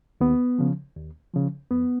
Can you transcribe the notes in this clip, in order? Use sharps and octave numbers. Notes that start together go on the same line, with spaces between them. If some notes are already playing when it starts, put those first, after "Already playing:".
D#2 B3
C#3 F3
D#2
C#3 F3
F2 B3